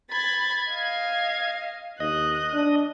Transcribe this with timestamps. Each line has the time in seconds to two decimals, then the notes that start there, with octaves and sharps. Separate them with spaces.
0.12 B5 G#6 A6
0.69 D#5 F5
2.00 D#2 D#5 F#6
2.54 D4